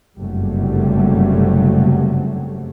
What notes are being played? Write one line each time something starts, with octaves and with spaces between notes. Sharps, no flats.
F#1 G2 C3 F#3 G3 A3